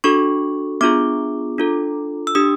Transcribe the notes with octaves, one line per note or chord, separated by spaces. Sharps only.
D4 F#4 A4 C#6
B3 D4 F4 G#4 D6
D4 F4 A4
E6
D4 G4 D#6